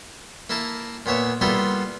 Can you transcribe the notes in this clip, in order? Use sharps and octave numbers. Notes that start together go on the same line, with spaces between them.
A#3 E4 A#4 A5
A#2 B3 C#5 E5
G3 A#3 B3 E4 F4 A4